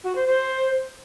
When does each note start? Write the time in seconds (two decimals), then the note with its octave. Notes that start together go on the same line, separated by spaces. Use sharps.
0.04 F#4
0.15 C5
0.27 C5